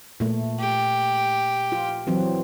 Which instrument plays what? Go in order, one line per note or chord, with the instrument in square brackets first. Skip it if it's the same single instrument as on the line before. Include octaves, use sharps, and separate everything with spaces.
[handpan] A#2 A3
[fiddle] G4
[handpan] F4
E3 F#3 C4